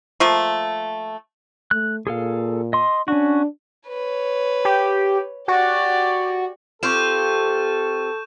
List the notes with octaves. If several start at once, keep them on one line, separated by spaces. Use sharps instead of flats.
F3 A3 A#3
A3 F#6
A#2 G#4 A4 F5
D#5 C6
C#4 D4 F#4
B4 C#5
G4
F#4 G4 D5
C4 F4 G4 A4 C#6 G6 E7